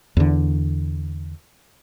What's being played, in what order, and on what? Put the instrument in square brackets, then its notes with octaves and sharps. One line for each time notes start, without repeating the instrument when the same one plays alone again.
[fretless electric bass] E2 D3